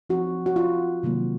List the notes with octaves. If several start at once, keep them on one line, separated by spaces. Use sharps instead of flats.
F3 C4 D#4 F#4
F#4
F4
C3 D#3 F#3 A#3